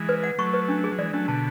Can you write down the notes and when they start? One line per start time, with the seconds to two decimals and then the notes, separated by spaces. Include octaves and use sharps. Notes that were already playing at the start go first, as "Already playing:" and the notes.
Already playing: E3 G#3
0.09 B4
0.24 F#5
0.38 F#3 A3 C#6
0.53 B4
0.68 D4
0.84 G#4
0.92 F#3
0.98 E3 G#3 D5
1.13 F#3 A3 D4
1.28 B2 D3 A5